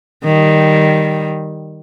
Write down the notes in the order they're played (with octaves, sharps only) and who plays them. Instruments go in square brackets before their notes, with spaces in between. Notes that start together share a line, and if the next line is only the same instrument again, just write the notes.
[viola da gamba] D#3 G3